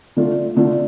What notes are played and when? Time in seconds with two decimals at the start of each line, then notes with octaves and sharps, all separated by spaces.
0.17 D3 A3 D4 F4
0.57 D3 A3 D4 F4